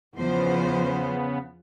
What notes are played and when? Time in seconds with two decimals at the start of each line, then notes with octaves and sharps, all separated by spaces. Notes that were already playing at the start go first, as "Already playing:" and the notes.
0.15 E2 C#3 F3 B3 C5